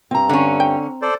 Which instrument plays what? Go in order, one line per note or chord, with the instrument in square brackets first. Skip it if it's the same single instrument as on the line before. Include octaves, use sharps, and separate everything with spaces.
[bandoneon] G2 [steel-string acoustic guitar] C4 A#5
[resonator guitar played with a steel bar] D3 C#4
[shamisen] G5
[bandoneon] A4 C5 D5